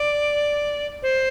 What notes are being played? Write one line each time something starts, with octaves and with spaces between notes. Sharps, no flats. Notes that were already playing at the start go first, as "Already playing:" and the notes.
Already playing: D5
C5